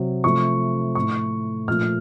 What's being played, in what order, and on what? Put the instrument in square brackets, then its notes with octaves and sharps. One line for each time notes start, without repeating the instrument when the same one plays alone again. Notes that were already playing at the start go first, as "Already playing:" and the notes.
Already playing: [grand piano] C3 F#3
C3 F3 A3 C#6
A2 A3 C#6
A#2 F3 A3 F6